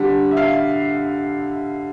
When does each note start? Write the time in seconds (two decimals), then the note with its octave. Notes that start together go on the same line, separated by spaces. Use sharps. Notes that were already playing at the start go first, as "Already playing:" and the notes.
Already playing: D3 G3
0.31 E5
0.37 F5